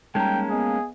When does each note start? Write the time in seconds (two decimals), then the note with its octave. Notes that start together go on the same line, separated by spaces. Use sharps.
0.15 G3 G#3 A#3 C#4 D#4 G5 A5 A#5
0.50 B3 G#4 D#5 F5